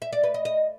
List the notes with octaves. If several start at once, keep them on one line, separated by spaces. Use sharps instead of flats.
E5
D5
B4
D#5
D#5